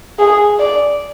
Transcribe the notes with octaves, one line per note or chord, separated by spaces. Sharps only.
G#4
D5